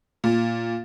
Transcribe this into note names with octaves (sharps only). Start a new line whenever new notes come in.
A#2